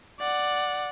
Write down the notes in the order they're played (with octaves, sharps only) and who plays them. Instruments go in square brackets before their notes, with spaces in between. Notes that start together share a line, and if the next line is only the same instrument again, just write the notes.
[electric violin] D5 F#5